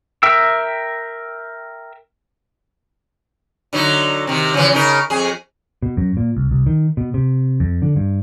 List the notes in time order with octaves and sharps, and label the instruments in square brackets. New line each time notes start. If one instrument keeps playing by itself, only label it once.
[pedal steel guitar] A#4 E5 G5 E6
[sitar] D3 F#3 D#4
C3 D#3
C#3 E3 F3
C#3 D#4 A#4
F2 G#4
[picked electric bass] B2
F#2
A#2
C2
C2
D#3
B2
C3
F2
D3
G2